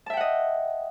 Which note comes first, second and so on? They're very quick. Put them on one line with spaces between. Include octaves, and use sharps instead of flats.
A5 E5 G5 F#5 D#5